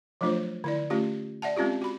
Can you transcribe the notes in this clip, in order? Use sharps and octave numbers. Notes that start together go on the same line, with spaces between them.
F3 F#3 A3 D4 F4 C5
D3 E4 D5
A3 C#4 F4 G4
D5 E5 F#5 A5
G#3 C4 C#4 F4 G4
F#4 B5